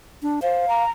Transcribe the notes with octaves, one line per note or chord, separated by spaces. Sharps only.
D4
C5 F5
A#5